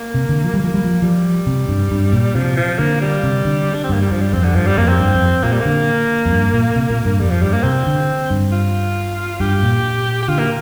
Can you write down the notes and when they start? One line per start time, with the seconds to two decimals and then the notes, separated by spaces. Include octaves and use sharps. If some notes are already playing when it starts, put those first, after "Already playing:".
Already playing: A#3
0.14 C3
0.29 D3
0.44 F3
0.54 G3
0.59 A#3
0.64 F3
0.74 G3
0.84 F3
1.02 F3 G3
1.47 C3
1.69 G2
1.91 G2
2.13 A#2
2.35 C3 F3
2.57 F3
2.79 D3 A#3
3.01 G3
3.23 C3
3.45 D3
3.74 D4
3.84 C4
3.89 G2 A#3
4.02 G3
4.11 G2 F3
4.22 G3
4.33 F2 C4
4.44 D3
4.55 G2 F3
4.66 G3
4.77 F2 A#3
4.88 C4
5.00 G2
5.14 F2
5.43 A#2 A#3
5.52 G3
5.61 D3 A#3
6.25 F2
6.32 G2
6.54 A#2
6.76 C3
6.90 A#2
7.05 G2
7.20 F2 G3
7.31 F3
7.42 G2 G3
7.53 A#3
7.64 C3 C4
7.86 D3
8.30 G2
8.52 F4
9.40 G2 G4
9.63 A#2
10.23 G4
10.28 D3 F4
10.39 A#3